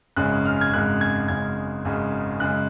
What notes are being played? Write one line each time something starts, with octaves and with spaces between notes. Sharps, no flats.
G#1 F#2 C#3 G#3 F#6
F6
G#6
G#1 F#2 C#3 G#3 F#6
G#6
G#1 F#2 C#3 G#3 G#6
G#1 F#2 C#3 G#3
F#2 C#3 G#3 F#6